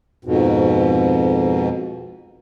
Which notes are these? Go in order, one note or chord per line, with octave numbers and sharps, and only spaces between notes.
F2 G#2 B2